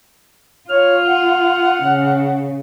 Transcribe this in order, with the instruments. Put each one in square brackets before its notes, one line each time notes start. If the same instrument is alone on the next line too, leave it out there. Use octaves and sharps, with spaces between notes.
[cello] F4 [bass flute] C#5 [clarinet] F6
[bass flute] F#5
[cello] C#3